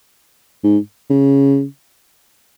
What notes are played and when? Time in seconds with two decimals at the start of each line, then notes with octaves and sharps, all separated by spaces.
0.64 G#2
1.10 C#3